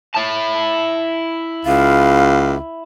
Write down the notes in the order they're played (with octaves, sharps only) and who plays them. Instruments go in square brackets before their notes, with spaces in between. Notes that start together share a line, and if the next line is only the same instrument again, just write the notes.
[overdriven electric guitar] E4 A5
[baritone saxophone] C#2 [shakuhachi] F5